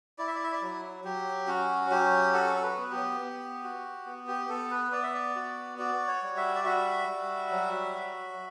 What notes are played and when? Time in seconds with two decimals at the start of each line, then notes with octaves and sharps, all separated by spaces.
0.18 E4 D5
0.27 E5
0.35 D5
0.43 E5
0.52 D5
0.62 F#3
1.04 F#3 G4
1.47 C#4 F#4
1.90 F#3 G4
2.33 F#4 A4
2.57 A4
2.62 B4
2.77 B3
2.91 G4
3.20 B3
3.64 F#4
4.06 B3
4.27 G4
4.49 B3 A4
4.71 B4
4.92 B3 D5
5.03 E5
5.14 D5
5.36 F#4
5.78 F#4 D5
6.07 C#5
6.22 G3
6.37 E5
6.55 D5
6.65 F#4 E5
7.08 G3
7.51 F#3
7.94 F#4